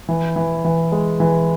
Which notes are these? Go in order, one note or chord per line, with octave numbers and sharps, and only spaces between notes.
E3
E3
E3
G#3
E3